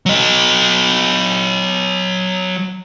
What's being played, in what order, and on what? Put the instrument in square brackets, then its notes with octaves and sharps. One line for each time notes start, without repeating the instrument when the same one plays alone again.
[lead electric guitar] F#3 D#5